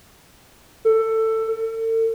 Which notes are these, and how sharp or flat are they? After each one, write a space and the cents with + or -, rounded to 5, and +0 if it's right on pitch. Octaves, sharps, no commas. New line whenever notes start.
A4 +15
A4 +40